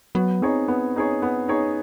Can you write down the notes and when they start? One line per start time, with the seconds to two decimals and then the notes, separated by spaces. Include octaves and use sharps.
0.15 F#3 B3
0.42 C4 D#4 G#4 C#5
0.68 B3
0.96 D#4 G#4 C#5
1.22 B3
1.48 D#4 G#4 C#5